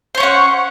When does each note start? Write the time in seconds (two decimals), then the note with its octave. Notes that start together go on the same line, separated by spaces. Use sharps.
0.15 C5
0.17 C#5
0.20 C#4
0.23 F#5